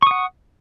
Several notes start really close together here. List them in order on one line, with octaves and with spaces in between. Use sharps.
C#6 D#6 F#5